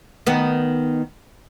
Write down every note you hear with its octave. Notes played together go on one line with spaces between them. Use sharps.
D#3 B3